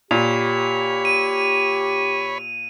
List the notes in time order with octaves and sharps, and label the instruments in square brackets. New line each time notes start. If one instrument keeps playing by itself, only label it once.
[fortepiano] A#2 [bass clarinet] G4 [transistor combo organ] C#5 B5 [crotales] F7
[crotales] D#7